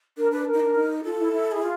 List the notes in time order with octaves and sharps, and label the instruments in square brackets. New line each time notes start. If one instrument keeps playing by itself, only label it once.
[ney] D4 [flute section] A#4
[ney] D4 [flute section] B4
[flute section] A#4
[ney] D#4
D4
D#4
[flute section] F4 [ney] A4
[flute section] E4
E4
[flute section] E4 [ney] G#4
[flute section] F4